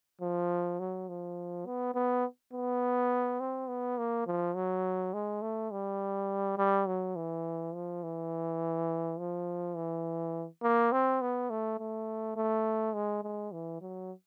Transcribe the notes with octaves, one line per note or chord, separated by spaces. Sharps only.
F3
F#3
F3
B3
B3
B3
C4
B3
A#3
F3
F#3
G#3
A3
G3
G3
F#3
E3
F3
E3
F3
E3
A#3
C4
B3
A3
A3
A3
G#3
G#3
E3
F#3